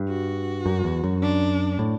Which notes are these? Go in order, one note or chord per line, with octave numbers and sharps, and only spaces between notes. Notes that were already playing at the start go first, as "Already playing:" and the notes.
Already playing: G2
F#4
F#2
E2
F#2
D4
A2